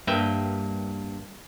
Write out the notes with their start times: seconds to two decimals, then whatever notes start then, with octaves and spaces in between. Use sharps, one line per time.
0.07 G2 A#3 B4 E5 G5